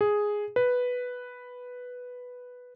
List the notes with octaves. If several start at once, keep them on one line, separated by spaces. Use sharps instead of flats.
G#4
B4